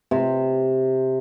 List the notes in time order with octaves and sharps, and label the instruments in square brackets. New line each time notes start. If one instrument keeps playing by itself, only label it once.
[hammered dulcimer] C3